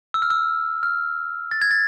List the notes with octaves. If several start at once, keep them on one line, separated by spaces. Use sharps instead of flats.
E6
F6
E6
F6
A6
G#6
A6